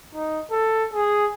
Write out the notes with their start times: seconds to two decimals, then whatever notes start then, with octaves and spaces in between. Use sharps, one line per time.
0.15 D#4
0.51 A4
0.94 G#4